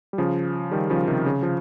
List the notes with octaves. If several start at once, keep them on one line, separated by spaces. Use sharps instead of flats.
G3
C#3 F3
D#3 G3
C#3 F3
C3 D#3
C#3
F3